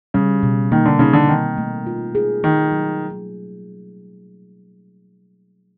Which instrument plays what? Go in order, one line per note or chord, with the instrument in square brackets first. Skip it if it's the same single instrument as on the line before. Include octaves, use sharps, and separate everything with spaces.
[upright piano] C#3 [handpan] G3
[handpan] B2
[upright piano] D#3 [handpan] A#3
[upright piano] D3
[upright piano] C#3 [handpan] D#4
[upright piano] D3
[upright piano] D#3 [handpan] C4
[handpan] A3
F4
G#4
[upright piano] D#3 [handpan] A3
[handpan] F#3